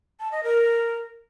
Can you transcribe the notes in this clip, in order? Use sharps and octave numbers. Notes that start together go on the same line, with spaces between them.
A5
D#5
A#4